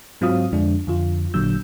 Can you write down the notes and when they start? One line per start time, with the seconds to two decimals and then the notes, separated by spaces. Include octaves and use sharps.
0.21 G#2 F#3 C4 F4 F5 D#6
0.52 F2 D3 F3 G#3 D4
0.87 F2 D3 F4
1.34 A1 A#2 D3 F#3 E6 G6